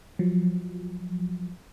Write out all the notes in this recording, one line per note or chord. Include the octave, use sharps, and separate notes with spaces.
F3 F#3